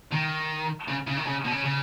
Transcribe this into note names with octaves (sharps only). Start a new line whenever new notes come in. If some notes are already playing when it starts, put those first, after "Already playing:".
D#3
C#3
C#3
D#3
C#3
B2
C#3
C#3